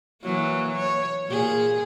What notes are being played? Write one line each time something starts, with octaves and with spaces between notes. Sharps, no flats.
E3 F#3 A#3
C#5
A#2 G#4